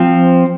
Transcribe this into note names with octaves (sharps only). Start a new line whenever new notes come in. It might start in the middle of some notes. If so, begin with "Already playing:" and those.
Already playing: F3 C4